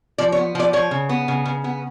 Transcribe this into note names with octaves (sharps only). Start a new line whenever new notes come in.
F3 D5
C#5
B3
F3 D5
F3 C#5
C#3
B3
C#3
C#3
B3